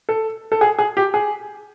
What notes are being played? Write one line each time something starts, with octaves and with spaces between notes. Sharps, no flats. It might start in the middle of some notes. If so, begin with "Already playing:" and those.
A4
A4
G#4
G#4
G4
G#4